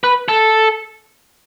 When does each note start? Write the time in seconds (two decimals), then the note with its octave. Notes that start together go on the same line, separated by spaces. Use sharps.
0.04 B4
0.28 A4